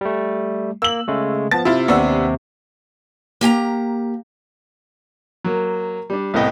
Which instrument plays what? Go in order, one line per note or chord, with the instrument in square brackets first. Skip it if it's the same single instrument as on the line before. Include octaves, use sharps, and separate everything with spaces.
[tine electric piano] G3 A3
[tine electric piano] A#3 [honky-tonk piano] E6 F#7
[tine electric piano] C#3 G#3 A3
[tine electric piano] F3 B3 [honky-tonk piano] A5 A6
[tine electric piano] C3 [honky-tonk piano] E4 F4
[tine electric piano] D#2 C3 C#6 [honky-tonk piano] B3 D4 E6
[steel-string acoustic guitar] A#3 G4 G#5 A#5
[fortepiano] F#3 A#3
G3 D4
C2 A2 B3 D#5 G5